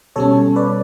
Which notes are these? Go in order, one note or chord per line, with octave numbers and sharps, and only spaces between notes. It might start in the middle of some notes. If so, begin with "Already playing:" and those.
B2 G3 C#4 A4 C#5
B4 D5